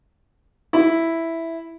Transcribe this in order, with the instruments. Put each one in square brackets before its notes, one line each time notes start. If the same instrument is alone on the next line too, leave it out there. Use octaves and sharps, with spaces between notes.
[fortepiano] E4